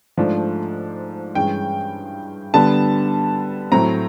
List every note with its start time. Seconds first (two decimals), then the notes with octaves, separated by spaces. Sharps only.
0.17 G#2 F3 A3 D4
1.35 G2 E3 G#3 C#4 G5
2.54 D3 G3 B3 A5
3.72 A2 F#3 A3 C4 A#5